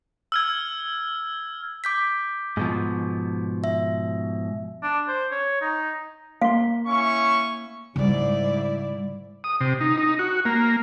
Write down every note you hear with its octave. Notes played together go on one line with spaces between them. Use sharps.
E6 F6 G#6
D6 G6 B6
G#2 B2 F3
E5
D4
C5
C#5
D#4
A#3 F5 C6
C#4 E4 C#6
G#2 C#3 G3 E4 D5
D#6
C3
D#4
D#4
F#4
A#3